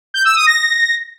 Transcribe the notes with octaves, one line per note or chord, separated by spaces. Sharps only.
G6
E6
D#6
A#6